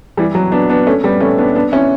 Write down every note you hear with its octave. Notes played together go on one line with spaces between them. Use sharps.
E3 G3
F#3
B3 D4
B3 D4
A3 C#4
G3 B3
A3 C#4
B3 D4
B3 D4
C#4 E4